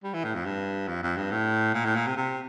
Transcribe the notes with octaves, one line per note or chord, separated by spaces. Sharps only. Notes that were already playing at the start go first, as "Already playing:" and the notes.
G3
E3
A2
F2
G2
F2
F2
G2
A2
A#2
A2
A#2
C3
C3